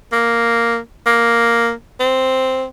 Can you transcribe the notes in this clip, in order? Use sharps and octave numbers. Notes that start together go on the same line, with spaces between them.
A#3
A#3
C4